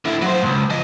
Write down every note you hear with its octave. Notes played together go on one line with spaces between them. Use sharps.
D3 E4
F#3 C5
C#2 G#2
F3 D#5